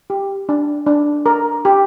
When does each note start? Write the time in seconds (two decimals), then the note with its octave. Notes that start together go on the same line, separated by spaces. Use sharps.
0.10 G4
0.49 D4
0.86 D4
1.26 A#4
1.65 G4